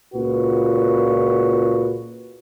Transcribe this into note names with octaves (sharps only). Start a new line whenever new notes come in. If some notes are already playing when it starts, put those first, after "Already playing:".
C#2 A#2 F#4 B4